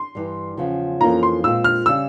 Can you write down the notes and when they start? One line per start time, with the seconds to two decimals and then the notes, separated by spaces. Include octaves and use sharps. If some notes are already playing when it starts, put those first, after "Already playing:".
Already playing: C6
0.15 G2 E3 G3
0.57 E2 C#3 F3
1.01 F2 E3 A#3 C#4 F4 A#5
1.23 C6
1.44 A#2 G#3 C4 F4 E6
1.64 F6
1.86 C#3 G3 E6